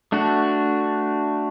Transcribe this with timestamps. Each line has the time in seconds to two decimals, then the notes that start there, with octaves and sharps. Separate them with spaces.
0.12 A3 D4 F#4